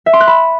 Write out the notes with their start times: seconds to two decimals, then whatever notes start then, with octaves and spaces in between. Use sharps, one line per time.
0.06 E5
0.13 C6
0.20 F#6
0.27 B5